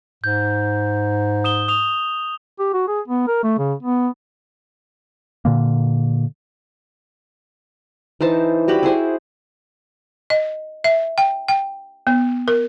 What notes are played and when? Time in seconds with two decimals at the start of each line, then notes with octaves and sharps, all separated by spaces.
0.24 G#2 G6
1.44 D#6 E7 G7
1.68 D#6 F7
2.59 G4
2.73 F#4
2.88 G#4
3.08 B3
3.28 A#4
3.44 A3
3.58 C#3
3.83 B3
5.45 A#2 D3 A#3
8.21 E3 D#4 C5 A5
8.68 G3 F#4 G4 B5
8.83 E4 G#4 C5 E5
10.30 D#5
10.84 E5
11.18 G5
11.48 G5
12.07 B3
12.48 A#4